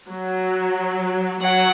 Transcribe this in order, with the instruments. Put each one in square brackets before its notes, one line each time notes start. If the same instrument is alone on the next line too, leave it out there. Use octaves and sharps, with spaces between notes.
[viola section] F#3
[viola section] F#3 [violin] F#5